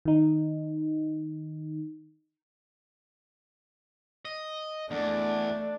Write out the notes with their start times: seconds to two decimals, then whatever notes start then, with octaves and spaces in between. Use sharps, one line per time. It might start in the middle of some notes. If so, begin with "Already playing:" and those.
0.05 D#3 D#4
4.25 D#5
4.91 E2 A3 D4